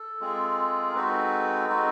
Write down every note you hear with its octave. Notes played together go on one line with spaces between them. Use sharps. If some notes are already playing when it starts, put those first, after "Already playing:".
Already playing: A4
G#3 C4 F4 G#4
A#4
G#3 C4 D#4 F#4 A4 B4
G#3 C4 D#4 F#4